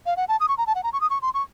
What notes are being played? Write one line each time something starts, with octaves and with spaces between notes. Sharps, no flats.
F5
F#5
A5
D#6
C#6
A#5
A5
F#5
A#5
C#6
D#6
C#6
C6
C#6